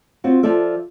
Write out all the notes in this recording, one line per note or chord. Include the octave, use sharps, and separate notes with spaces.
C4 F4 F#4
F3 F4 A4 D5 E5